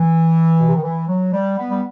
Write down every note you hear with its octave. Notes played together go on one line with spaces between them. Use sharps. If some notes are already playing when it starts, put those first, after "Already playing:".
Already playing: E3
B2
C3
D#3
E3
F#3
G3
B3
G3